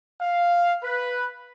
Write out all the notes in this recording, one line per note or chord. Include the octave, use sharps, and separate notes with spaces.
F5
B4